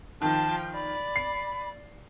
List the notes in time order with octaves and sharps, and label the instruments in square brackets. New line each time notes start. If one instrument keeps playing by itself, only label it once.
[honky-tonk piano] D#3 [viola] F3 G5 [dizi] A5
[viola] D5 [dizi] B5
[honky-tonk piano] C7